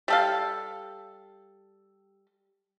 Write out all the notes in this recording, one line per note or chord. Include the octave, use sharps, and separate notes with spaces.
G3 A4 F5